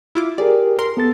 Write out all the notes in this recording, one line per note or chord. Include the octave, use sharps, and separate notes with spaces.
E4 F4 D6
G4 G#4 A#4 D5
A#4 C6
B3 A4 A6